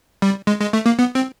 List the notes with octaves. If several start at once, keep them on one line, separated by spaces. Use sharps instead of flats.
G3
G#3
G#3
A3
A#3
B3
C4